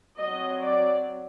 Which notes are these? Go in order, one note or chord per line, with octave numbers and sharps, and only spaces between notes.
F#3 C4 D#5
D5